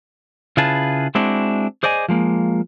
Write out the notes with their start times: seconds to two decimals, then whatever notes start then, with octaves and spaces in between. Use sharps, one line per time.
0.57 C#3 E4 F4 G#4 B4 A5
1.15 G#3 C4 D4 E4 F#4
1.83 G#4 C5 D5 D#5 G#5
2.09 F3 G#3 A#3